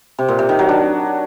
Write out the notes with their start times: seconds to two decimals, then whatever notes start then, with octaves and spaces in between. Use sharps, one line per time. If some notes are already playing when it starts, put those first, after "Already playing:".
0.19 C3
0.28 A#2
0.39 C3
0.49 D#3
0.59 F#3
0.69 D4